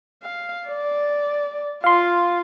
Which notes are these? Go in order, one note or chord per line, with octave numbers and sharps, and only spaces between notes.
F5
D5
F4 F5 C6